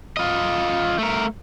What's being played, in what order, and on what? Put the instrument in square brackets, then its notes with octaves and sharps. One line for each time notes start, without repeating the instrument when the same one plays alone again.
[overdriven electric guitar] F4 D#5
A3 A#4